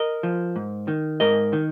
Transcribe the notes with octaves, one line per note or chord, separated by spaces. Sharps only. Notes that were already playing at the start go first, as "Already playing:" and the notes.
Already playing: A#4 D#5
F3
G#2
D#3
G#2 A#4 D#5
D#3